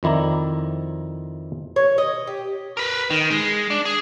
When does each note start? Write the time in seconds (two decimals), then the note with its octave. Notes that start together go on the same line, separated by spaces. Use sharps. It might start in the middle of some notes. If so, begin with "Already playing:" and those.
0.03 F2 D#3 E4 D5 A#5
1.76 C#5
1.98 D#5
2.27 G4
2.77 A#4 B4
3.10 D#3
3.30 G#3
3.70 D4
3.85 G#4